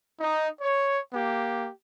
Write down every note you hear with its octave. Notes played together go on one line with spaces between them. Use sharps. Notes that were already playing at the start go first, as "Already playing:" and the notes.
D#4
C#5
A#3 G4